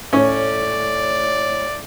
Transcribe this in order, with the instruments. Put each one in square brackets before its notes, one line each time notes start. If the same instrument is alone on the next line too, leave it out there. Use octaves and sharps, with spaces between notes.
[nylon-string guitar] A2 [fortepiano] C#4 [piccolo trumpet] D5